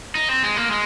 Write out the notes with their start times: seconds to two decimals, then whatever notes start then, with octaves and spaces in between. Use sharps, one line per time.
0.15 D#4
0.29 C4
0.43 G#3
0.56 A#3
0.71 G#3